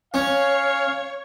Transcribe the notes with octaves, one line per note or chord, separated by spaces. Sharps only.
C#4 C#5 F5